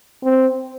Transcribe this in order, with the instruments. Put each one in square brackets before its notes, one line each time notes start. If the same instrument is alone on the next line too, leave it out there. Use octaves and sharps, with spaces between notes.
[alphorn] C4